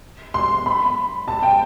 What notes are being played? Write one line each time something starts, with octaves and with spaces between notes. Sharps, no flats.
C6
B5
A5
G5